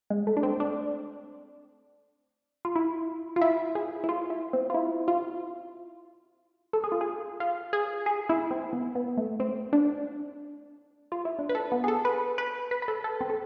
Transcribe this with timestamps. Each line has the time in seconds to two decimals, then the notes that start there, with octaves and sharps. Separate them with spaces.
0.10 G#3
0.27 A3
0.37 D4
0.43 C4
0.60 D4
2.65 F4
2.75 E4
3.36 F4
3.41 E4
3.75 G#4
4.04 E4
4.09 F4
4.30 E4
4.53 C4
4.70 F4
4.74 E4
5.08 F4
6.73 A4
6.84 G#4
6.92 F4
7.01 G#4
7.40 F4
7.73 G#4
8.06 G#4
8.29 E4
8.51 C4
8.73 B3
8.95 B3
9.17 A3
9.40 C4
9.73 D4
11.12 F4
11.25 E4
11.39 D4
11.49 B4
11.55 A4
11.72 B3
11.84 G#4
11.88 A4
12.05 B4
12.38 B4
12.71 B4
12.82 B4
12.88 A4
13.04 A4
13.21 C4
13.30 A4